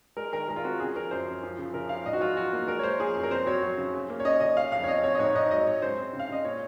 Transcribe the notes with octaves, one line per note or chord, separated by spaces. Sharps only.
G#3 A#4
D#3 A#4
G#3 A#4
F4
C4 F#4
C#3 G#4
F3 A#4
F#2 C5
F#2
F3
C#3
C#3 A#4
F3 F5
G#2 D#5
F#4
F#3 F4
F#3 F#4
A#3
G#3 A#4
C#5
G#3 C5
F3 G#4
F#2
A#4
C4 C5
F#3 C#5
F#3
C#3
C#3
A#3
C#5
C#3 D#5
C#3 D#5
C#3 F5
F2 F5
C#5
C4 D#5
C4 C#5
D#5
G#2 C#5
G#2 D#5
F#3 D#5
G#2 C#5
C#3 C5
C4
C#3
F5
C#3 D#5
A#2 C#5